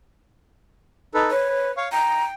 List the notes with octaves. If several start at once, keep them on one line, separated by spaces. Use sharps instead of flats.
D#4 A4 B4
B4 C#5
B4
C#5 F5 C#6
G5 A#5